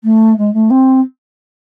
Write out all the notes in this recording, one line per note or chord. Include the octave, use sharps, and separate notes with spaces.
A3
G#3
A3
C4